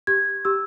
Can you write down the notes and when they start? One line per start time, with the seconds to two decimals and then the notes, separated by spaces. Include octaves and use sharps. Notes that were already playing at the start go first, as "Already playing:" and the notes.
0.07 G4 G#6
0.45 G4 E6